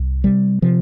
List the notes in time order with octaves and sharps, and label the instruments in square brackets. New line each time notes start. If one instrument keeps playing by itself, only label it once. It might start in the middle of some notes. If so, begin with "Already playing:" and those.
Already playing: [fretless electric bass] C2
C3 G3
C3 F3